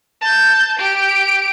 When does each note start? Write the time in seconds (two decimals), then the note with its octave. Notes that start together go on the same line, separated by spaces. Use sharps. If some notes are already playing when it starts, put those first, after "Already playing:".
0.21 A5 G6
0.79 G4 D7